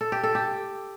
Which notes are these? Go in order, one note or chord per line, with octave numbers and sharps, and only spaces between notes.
A4
G4
A4
G4